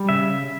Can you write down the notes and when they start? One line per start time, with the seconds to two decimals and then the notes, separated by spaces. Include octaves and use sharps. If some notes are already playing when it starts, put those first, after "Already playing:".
Already playing: G3
0.09 C#3 E5